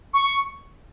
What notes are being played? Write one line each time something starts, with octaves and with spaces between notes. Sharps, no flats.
C#6